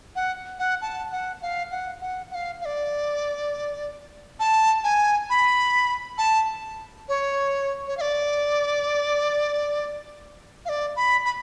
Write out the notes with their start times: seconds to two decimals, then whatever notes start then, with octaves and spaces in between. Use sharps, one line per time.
0.16 F#5
0.59 F#5
0.82 A5
1.12 F#5
1.42 F5
1.71 F#5
2.01 F#5
2.31 F#5
2.35 F5
2.61 F5
2.65 D5
4.40 A5
4.84 G#5
5.30 B5
6.18 A5
7.09 C#5
7.87 C#5
7.97 F5
8.01 D5
10.65 F5
10.69 D5
10.96 B5
11.25 B5